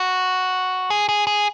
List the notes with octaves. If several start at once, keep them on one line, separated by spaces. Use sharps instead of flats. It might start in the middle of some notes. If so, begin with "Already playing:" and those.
Already playing: F#4
G#4
G#4
G#4